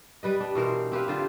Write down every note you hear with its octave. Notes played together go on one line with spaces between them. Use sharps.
G3 B4 D#5
D4
B2 E3 A#4 C5
C4 G4 B4 F5
D3 F4 C5